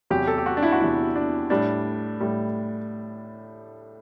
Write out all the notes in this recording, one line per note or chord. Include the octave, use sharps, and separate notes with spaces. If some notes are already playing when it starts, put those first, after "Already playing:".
E2 C3 F#3 G4
A4
G4
F#4
D4
E4
F#4
E2 C3 F#3 E4
D4
A2 G3 D4
A2 G3